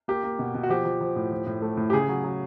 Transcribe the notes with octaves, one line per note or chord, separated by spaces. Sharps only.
A#3 G4
A#3
B2
B2
F#4
F3 G4
F3
F3
A2
F3
A2
A3
A2
G4
C#3 G#4
F#3
F#3